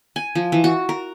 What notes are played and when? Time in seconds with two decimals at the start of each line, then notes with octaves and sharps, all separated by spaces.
0.16 G#5
0.35 F3
0.52 E3
0.64 F#4
0.89 A#4